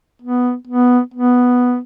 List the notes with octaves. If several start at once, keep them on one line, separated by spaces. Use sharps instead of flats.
B3
B3
B3